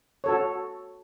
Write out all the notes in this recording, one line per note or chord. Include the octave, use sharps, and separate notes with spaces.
F#4 A4 C#5